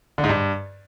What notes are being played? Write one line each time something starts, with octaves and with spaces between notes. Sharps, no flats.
D3
G#2
G2